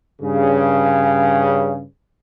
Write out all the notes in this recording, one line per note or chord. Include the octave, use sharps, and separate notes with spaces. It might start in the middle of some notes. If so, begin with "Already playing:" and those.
G2 C#3